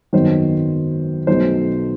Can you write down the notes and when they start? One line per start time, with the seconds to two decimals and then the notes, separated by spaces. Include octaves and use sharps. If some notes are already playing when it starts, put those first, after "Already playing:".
0.13 G#1 F#2 D#3 F#3 B3 C5
1.27 B1 B2 F#3 A3 C5